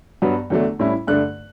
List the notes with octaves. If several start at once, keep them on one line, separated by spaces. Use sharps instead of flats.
G2 F#3 B3
E2 D3 F#3 A3 D4
A2 G3 C#4 E4
G2 D3 A3 D4 F#6